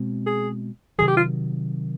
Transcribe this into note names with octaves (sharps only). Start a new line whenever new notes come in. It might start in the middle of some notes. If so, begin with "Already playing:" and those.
Already playing: B2 G#3 C4
G#4
C3 D#3 F#3 G#4
G4
F4